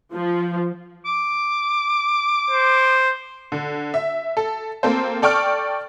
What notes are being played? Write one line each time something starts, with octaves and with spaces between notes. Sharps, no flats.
F3
D6
C5
D3
E5
A4
A#3 C4 A4 C5
A4 D5 G5 C#6 F6